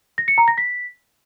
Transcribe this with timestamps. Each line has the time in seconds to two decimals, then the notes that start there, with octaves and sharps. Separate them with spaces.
0.18 A#6
0.28 C#7
0.38 A#5
0.48 A#6
0.58 B6